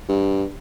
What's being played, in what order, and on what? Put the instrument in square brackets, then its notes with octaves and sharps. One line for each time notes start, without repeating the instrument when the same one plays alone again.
[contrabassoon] G2